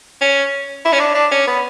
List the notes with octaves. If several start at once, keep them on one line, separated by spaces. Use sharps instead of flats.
C#4
E4
C#4
D4
D4
C#4
B3